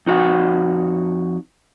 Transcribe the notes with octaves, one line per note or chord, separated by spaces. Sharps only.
F2 D#4 F#4 F#5